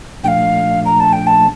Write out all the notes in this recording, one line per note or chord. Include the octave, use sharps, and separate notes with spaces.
A#2 F3 A3 D4 F5 G5
A#5
A5
G5
A5